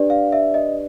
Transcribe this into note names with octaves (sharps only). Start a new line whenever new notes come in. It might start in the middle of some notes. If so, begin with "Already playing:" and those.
Already playing: D4 G4 B4 D5
F5
E5
D#5